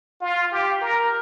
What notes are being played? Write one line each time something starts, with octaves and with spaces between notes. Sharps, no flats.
F4
G4
A#4